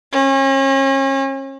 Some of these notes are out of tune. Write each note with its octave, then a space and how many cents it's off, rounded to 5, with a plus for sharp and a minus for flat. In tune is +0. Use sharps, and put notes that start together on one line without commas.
C#4 -35